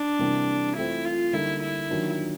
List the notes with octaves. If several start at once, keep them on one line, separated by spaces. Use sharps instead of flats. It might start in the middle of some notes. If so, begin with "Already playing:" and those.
Already playing: D4
C3 E3 G3 A#3
E3 A3 C4 E4 F4
F4
D3 G3 A#3 D#4 E4
E4
D#3 F#3 A#3 D4 F4